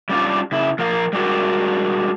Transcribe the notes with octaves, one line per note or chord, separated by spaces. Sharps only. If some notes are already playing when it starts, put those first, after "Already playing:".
G3 C#4 D4 F4
C#3 E4
F3 A#4 F5
G3 G#3 D4 F#4 A#4